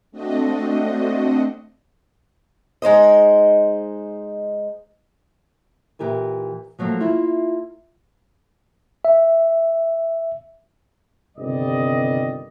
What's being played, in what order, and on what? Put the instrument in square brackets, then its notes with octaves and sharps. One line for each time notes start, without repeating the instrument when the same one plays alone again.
[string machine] A3 C4 D4 F#4 D#5
[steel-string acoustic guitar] G#3 D#4 C5 D#5
[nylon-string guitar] A#2 E3 G4 A#4 G#5
F3 F#3 A3 A#3
A#3 E4 F4
[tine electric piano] E5
[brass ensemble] G1 C3 D#3 G3 D5 D#5